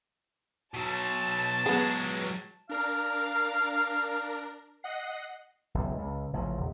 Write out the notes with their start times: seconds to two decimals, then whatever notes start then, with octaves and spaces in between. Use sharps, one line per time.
0.74 B2 F#3 A5
1.66 F#3 G#3 B3 G#4
2.69 D4 A#4 F5
4.83 D#5 F#5 C7
5.74 F#1 B1
5.98 C#2
6.33 A1 C#3 F3
6.57 D#1